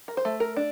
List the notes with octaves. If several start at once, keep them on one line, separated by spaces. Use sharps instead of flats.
A#4
C5
A3
A#4
D4